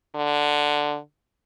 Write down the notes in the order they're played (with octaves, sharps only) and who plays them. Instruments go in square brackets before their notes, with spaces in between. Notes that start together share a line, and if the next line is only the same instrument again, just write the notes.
[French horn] D3